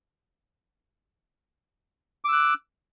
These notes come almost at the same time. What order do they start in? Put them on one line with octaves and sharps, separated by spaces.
D6 E6 F#6